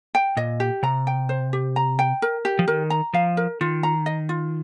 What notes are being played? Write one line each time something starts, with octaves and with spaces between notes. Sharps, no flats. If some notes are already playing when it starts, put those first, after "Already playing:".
G5
A#2 D#5
G4
C3 A#5
G5
C5
G4
A#5
G5
A#4
G4
F3
D#3 A#4
A#5
F3 F5
A#4
D#3 F4
A#5
D#5
F4